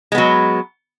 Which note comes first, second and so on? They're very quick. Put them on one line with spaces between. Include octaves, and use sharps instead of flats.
G#3 B3 F#3